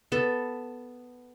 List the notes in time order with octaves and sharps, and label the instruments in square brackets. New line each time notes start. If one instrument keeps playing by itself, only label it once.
[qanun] B3 A4